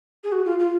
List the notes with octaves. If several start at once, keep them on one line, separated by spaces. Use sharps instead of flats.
G#4
F#4
F4
F4